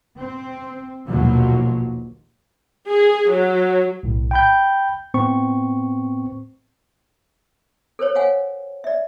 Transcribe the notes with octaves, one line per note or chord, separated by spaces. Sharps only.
C4
A#1 D#2 B2 F3 F#3 A#3
G#4
F#3
B1 A2
G5 B5 G6
A2 B3 C4 C#6
A4 A#4 C5 C#5
C#5 F5 F#5 G#5
D5 E5